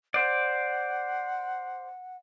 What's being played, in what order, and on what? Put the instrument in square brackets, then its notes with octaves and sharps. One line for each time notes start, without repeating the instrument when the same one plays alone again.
[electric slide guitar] C5 D5 [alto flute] F#5